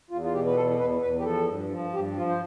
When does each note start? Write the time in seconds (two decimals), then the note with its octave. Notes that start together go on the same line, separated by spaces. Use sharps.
0.10 E2 F4
0.24 F4
0.33 B2 G4
0.46 B4
0.56 E2 A4
0.79 E2 B4
1.02 E2 B4
1.19 G4
1.24 F3 A4
1.48 G2
1.70 F3
1.93 G2 G4
2.16 F3 F4
2.29 C5